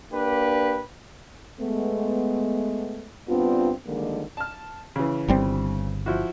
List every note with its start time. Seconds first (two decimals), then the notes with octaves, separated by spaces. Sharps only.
0.12 A#3 D4 G4 B4
1.60 G#3 A3 B3
3.29 G2 B3 C4 D4 F4
3.87 D3 D#3 F3 G3 G#3 A#3
4.37 A5 F6
4.96 C#3 E3
5.28 G1 G3 C4
6.06 F3 E4 F#4